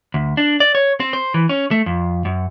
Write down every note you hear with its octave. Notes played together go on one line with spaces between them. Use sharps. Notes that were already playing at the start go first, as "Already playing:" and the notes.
D2
D4
D5
C#5
C4
C5
E3
C#4
A3
F2
F#2